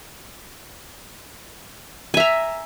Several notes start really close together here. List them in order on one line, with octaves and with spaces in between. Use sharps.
G#5 E5 A#5